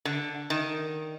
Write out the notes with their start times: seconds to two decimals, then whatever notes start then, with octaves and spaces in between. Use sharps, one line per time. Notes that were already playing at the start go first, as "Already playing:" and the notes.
0.05 D3
0.50 D#3